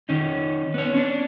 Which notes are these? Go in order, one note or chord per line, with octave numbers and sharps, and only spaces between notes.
D#3 C#4 D#4
B3 C#5
C#4 D4